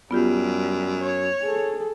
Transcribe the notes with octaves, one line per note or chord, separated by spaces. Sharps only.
F#2 G3 B3 F4 G4
C#5
G#4 A4